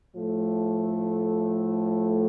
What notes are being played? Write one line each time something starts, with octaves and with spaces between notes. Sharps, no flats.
A2 F3 A3